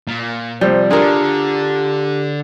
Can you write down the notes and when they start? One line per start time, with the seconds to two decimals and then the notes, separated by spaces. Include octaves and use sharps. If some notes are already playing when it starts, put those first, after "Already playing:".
0.08 A#2
0.61 C3 F3 G3 C5
0.91 D3 D4 F4 G4 G#4 A#4